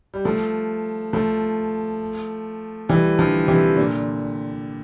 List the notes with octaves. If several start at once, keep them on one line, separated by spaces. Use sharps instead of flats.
G3
F3 A3
F3 A3
E3 G3
D3 F3
C3 E3
A#2 D3